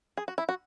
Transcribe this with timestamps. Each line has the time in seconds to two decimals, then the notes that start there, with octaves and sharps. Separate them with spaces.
0.17 G#4
0.28 F#4
0.38 E4
0.49 F#4